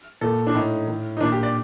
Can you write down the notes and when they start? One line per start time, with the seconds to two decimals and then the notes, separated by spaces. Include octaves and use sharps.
0.21 A#2 A4
0.47 D4
0.55 A2 D#4
0.87 A2
1.17 D#4
1.21 A#2 D4
1.32 G4
1.43 D5